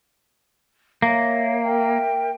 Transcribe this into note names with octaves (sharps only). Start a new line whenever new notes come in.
A#3 C#5 E5
A#4 E5 G5